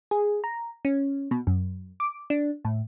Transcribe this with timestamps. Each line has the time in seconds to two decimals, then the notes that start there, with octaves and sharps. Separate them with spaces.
0.11 G#4
0.44 A#5
0.85 C#4
1.31 B2
1.47 F#2
2.00 D6
2.30 D4
2.65 A2